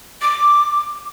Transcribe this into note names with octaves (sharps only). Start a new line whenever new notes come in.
D6